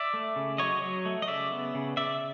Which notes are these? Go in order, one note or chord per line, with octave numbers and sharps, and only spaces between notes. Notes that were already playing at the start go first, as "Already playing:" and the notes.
Already playing: D5 E5
A3
C#3
F#3 C#5 D#5
F#3
A3
D#5
C#3 D5 E5
B3
C#3
C#3 D5 E5